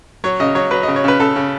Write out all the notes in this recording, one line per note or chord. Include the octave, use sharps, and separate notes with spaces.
F#3 C#5
C#3 D#5
F#3 C#5
F#3 B4
C#3 D#5
C#5
C#3 B4
C#3 A4
C#3